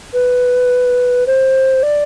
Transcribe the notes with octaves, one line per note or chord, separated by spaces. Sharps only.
B4
C5
D5